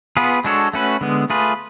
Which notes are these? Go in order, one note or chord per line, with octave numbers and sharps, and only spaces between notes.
B3 F4 G#4 B4
G#3 D4 F#4 A4 C#5
A3 C#4 F#4 B4
D3 G#3 B3
A3 F4 G#4 B4